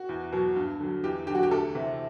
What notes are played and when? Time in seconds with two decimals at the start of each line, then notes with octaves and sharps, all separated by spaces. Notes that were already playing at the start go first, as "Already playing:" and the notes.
Already playing: F#4
0.09 E2
0.32 B2 F#3
0.56 G2
0.80 D3 F#3
1.04 E2 G4
1.27 D3 G4
1.31 F#3 F#4
1.43 G4
1.51 D2 A4
1.75 C3 E3